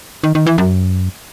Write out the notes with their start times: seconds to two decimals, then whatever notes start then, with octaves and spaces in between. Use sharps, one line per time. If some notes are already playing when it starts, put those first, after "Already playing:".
0.24 D#3
0.35 D#3
0.46 E3
0.58 F#2